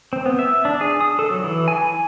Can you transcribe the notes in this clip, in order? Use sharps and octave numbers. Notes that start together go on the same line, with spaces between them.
C4
B3
E5
D4
G#4
D#6
A4
F#3
E3
G#5
G#5